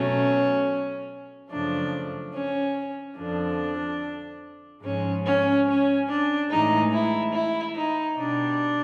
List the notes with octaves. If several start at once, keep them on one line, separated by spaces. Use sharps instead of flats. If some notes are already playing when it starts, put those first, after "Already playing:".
Already playing: B2 F#3 A3 C#4
F#2 C#3 F3 A3 D4
C#4
F2 D3 F3 D4
G#2 F3 G#3 C#4
C#4
C#4
D4
A2 E3 G#3 D#4
E4
E4
D#4
B2 G3 D4